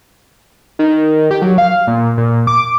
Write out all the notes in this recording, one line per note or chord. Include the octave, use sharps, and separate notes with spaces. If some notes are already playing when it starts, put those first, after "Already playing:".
D#3
G4
F#3
F5
A#2
A#2
D6